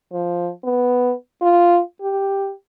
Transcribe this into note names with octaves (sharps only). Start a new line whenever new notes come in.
F3
B3
F4
G4